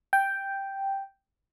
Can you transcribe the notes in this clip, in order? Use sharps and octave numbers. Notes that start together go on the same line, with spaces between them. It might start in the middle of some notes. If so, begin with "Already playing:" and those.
G5